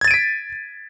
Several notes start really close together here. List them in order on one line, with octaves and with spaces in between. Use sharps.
G#6 A6 D#7 D7 B6